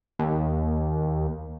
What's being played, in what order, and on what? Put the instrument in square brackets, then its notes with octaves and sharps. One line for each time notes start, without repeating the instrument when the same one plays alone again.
[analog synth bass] D#2